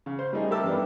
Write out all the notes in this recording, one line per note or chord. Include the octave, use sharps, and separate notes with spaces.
C#3
C5
G3 A3 D#4 G#4
G4 A4 A#4 E5 A5 E6
G2 B3 D4